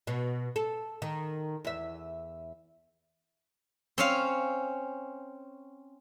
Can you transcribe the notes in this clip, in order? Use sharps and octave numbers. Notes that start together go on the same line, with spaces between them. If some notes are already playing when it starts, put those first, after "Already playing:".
B2
A4
D#3
E2 E5
C4 C#4 F5